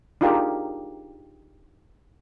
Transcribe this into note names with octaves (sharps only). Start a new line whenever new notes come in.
D4 D#4 F4 G4 G#4 A#4